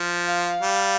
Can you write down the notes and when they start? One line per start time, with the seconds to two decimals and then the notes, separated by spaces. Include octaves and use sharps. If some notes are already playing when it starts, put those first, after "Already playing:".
Already playing: F3
0.27 F5
0.61 G3